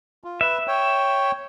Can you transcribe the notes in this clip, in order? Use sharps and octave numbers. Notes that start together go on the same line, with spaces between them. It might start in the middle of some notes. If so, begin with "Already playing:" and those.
F4
B4 E5
C#5 G5